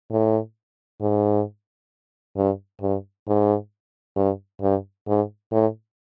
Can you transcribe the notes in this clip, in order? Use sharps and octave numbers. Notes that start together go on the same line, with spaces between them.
A2
G#2
G2
G2
G#2
G2
G2
G#2
A2